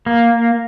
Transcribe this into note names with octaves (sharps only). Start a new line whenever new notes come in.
A#3